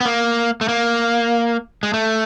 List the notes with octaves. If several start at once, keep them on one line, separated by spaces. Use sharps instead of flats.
B3
A#3
A3
A#3
G#3
A3